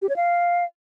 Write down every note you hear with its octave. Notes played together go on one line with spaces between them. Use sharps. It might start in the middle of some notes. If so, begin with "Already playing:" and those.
G4
C#5
F5